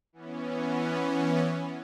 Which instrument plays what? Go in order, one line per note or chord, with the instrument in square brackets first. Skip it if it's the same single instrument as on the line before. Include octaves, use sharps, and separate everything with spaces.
[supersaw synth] E3 B3 C#4